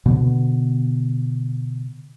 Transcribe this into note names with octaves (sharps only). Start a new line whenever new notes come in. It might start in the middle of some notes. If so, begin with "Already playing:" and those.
B2 D3 B3